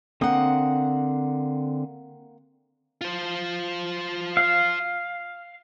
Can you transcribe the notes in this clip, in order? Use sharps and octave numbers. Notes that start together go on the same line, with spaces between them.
D3 A#3 C4 F#5 D#6
F4 C5
F5